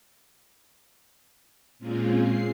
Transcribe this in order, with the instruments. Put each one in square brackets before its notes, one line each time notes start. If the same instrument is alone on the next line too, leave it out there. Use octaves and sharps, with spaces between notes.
[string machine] A#2 G#3 C4 C#4 F4 G#4
C7